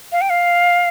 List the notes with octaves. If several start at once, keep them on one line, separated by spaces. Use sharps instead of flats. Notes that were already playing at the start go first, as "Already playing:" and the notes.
F5
G5
F5